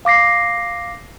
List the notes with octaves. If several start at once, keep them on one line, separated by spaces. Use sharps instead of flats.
F5 D6 A#6 C7